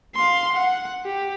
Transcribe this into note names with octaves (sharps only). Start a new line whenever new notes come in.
F5 C6
F#5
G4